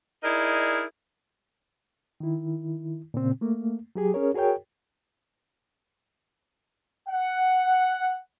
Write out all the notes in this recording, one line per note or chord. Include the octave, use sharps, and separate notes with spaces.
D#4 E4 G#4 A#4 D5 D#5
D#3 E4
A#2 C#3 C4
A3 A#3
F#3 G4 G#4
C#4 G#4 A#4 C#5
F#4 G#4 A#4 C#5 G5
F#5